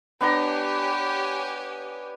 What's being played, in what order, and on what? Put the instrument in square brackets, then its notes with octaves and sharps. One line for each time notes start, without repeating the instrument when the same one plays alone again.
[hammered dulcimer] B3 D4 A#5 [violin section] G4 C#5 G#5